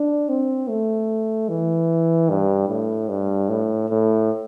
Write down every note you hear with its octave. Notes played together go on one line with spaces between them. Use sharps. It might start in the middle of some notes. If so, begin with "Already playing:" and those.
Already playing: D4
C4
A3
E3
G2
A2
G2
A2
A2